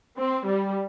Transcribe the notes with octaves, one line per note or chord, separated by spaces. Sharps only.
C4
G3